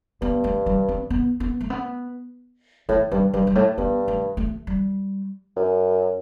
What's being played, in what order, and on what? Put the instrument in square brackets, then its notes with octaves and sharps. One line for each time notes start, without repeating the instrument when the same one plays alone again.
[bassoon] G2 [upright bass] B3
[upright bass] A3
G3
C4
B3
B3
A3
B3
[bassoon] A2 [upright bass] A3
[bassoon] G2 [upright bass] G3
[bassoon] G2 [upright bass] G3
[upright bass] G3
[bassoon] A2 [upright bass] A3
[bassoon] G2 [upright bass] B3
[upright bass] A3
A3
G3
[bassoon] F#2